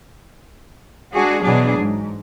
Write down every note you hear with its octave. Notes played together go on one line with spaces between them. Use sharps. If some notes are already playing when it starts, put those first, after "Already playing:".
G#3 D4 F#4 G#4
B2 E3 F#3 D4 G#4
G#2